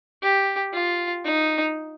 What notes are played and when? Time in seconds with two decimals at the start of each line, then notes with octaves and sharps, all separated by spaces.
0.23 G4
0.73 F4
1.25 D#4